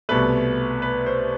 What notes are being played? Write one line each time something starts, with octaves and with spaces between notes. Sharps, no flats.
C2 B2 A3 B4
B4
C5